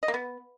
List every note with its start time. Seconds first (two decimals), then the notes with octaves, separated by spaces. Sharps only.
0.03 D#5
0.08 A#3
0.14 B3